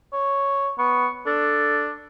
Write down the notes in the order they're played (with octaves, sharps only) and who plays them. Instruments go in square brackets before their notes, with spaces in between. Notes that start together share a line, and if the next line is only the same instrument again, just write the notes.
[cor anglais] C#5
[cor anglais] B3 [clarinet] C#6
[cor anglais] D4 [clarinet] A4